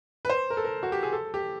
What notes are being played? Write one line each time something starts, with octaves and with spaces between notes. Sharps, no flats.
B4
C5
A#4
A4
A#4
F#4
G4
G#4
A4
G4